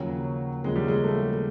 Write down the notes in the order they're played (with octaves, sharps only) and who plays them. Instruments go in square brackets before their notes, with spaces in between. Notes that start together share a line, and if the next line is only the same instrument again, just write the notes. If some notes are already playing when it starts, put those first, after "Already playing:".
Already playing: [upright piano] D#2 C#3 F3 [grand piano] F#3
[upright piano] D#2 C#3 F3 [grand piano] G#3
[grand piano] G3
G#3
A3